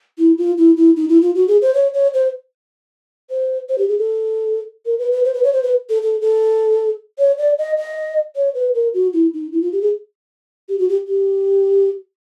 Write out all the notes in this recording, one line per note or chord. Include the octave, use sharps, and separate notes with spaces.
E4
F4
E4
E4
D#4
E4
F4
F#4
G#4
C5
C#5
C#5
C5
C5
C5
G4
G#4
A4
A#4
B4
B4
C5
B4
C#5
C5
B4
A4
A4
A4
C#5
D5
D#5
D#5
C#5
B4
A#4
F#4
E4
D#4
E4
F4
G4
G#4
G4
F#4
G4
G4